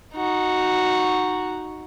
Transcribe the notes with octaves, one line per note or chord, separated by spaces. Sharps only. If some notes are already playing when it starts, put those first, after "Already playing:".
D#4 F#4